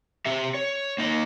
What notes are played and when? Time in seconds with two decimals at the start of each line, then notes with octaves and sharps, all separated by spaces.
0.26 C4 G4 E5
0.54 C#5
0.98 A#3 D#4 D#5